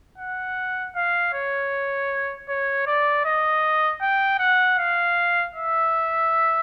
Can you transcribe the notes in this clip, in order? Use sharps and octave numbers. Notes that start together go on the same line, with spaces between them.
F#5
F5
C#5
C#5
D5
D#5
G5
F#5
F5
E5